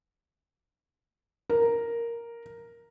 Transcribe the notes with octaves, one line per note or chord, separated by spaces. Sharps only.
A#4